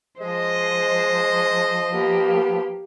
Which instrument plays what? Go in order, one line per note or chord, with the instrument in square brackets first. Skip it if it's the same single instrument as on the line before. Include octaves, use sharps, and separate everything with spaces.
[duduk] F3 [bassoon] G#3 [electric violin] C5 [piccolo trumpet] D#5
[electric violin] A#3 G4 [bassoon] B3